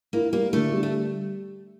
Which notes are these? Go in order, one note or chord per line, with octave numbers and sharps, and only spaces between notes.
A#3 E4
G3 A#3
D3 A3
G3
A3